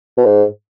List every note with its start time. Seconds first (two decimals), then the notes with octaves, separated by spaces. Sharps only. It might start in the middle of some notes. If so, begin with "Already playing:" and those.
0.17 B2
0.25 G#2